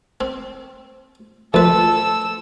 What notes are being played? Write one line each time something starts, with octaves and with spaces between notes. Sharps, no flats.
C4
D2 F3 A4 B4 E6